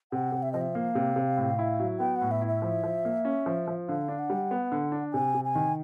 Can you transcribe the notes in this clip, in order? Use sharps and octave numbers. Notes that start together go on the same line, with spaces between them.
C3 F#5
C3
E5
F3 D#5
E5
A#3 F5
C3
C3
A2
E4
F#3
B3 G5
F#5
A2
E5
E4
E5
F3
F3
A#3
C#4
F3
F3
D3 F5
D4
F#5
G3
B3
D3
D4
C3 G#5
C3
G#5
D#3